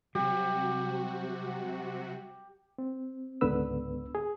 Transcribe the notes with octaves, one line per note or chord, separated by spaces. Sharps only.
C3 F#3 G3 F#4 G4
C4
C#2 G#2 D3 B3 B4 E6
G#4